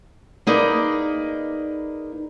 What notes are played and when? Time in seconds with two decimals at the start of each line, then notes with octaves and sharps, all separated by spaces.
0.47 A#3 D#4 G#4 B4 D5